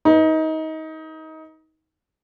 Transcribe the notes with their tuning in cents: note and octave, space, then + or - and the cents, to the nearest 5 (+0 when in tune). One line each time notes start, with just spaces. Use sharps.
D#4 +25 B4 -15